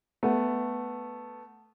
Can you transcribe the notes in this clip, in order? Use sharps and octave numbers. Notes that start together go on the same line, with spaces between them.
A3 B3